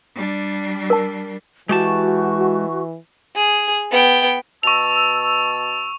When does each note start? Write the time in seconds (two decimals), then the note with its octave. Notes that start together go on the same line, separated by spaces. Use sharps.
0.14 G3 D4
0.90 A#4 A5
1.69 E3 G#3 F#4 G4 A5 C#6
3.36 G#4
3.91 B3 G5
4.63 B2 A5 C#6 E6 F7